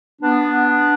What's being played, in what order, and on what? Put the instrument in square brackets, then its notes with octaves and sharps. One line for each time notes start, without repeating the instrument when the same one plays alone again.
[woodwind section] B3 D4